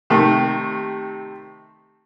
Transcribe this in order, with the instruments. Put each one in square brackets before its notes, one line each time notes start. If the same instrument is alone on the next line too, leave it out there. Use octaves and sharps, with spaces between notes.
[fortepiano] C3 D#3 A3